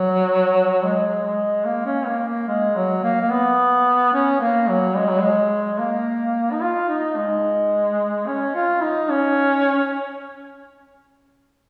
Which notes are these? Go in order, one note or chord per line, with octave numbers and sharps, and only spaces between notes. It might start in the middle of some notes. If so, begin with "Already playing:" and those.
Already playing: F#3
G#3
G#3
A#3
C#4
A#3
A#3
G#3
F#3
A#3
A#3
B3
C#4
A#3
F#3
G#3
F#3
G#3
A#3
D#4
F4
D#4
G#3
C#4
F4
D#4
C#4